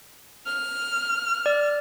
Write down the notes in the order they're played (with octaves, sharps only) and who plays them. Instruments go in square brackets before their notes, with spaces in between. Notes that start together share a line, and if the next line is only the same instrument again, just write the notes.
[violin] F6
[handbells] D5